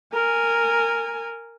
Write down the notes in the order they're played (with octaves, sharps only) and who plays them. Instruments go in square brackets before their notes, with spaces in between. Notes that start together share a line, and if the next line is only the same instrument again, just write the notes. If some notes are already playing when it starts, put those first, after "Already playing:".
[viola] A#4 G#5